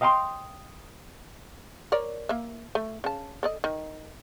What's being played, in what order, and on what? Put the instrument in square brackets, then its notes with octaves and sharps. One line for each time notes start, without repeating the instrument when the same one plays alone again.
[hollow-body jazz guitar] D#5 F5 G5 A#5 C6
[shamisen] A#4 C#5 D5
A#3 E5
A3
C#3 A5
A4 D5 D#5
D#3